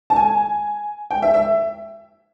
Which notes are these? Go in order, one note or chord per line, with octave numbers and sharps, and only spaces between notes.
A5
G#5
G5
E5
E5